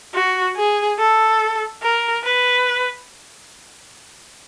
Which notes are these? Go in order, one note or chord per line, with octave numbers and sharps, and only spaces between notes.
F#4
G#4
A4
A#4
B4